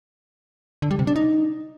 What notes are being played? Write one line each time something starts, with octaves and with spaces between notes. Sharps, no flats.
D3
G3
C3
D4
D#4